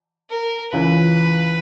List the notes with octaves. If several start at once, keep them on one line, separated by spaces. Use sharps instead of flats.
A#4
C#2 C#3 E3 B4